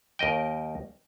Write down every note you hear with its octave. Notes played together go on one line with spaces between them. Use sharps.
D#2 A#4 D#5 G5